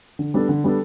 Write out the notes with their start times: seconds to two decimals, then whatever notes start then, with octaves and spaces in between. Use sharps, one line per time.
0.19 D3
0.34 G3 B3 D4 A4
0.49 D3
0.64 G3 B3 D4 A4